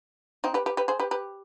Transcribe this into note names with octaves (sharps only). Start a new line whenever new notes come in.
C4 D#4
G4 B4
G4 B4
G4 B4
G#4 C5
G4 B4
G4 B4